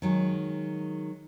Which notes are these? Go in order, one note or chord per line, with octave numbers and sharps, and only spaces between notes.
D#3 F#3 G#3